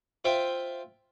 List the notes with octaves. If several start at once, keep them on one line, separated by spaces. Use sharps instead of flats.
F4 C5 E5 G5